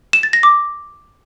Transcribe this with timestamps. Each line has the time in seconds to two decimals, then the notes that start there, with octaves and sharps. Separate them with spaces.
0.13 E7
0.23 A6
0.33 A#6
0.43 D6